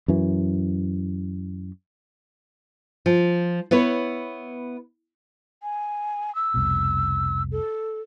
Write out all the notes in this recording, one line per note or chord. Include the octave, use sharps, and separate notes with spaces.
F#2 E3
F3
B3 E4 B4 C#5
G#5
E6
F1 C2 B2
A4